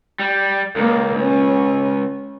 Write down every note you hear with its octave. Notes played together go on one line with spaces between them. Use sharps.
G3
C#2 A#3
C#4